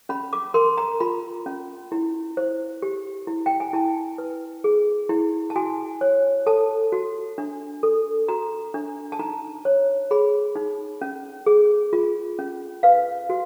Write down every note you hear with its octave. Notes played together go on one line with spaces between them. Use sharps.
C#4 B5
D6
A#4 C6
A#5
F4 B5
C#4
E4
C5
G4
E4
G5
G#5
E4 A5
B4
G#4
E4
A5
F#4 G#5
C#5
A4 A5
F#4
D4
A4
F#4 A#5
D4
A5
D#4 A#5
C#5
G#4 B5
D#4
C#4
G#4
F4
C#4
B4 F5
F#4